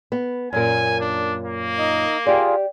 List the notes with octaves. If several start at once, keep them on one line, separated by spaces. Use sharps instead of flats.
B3
F#2 A#2 A#4 G#5
D4
A#3
D#4 D#5
F4 G4 G#4 D5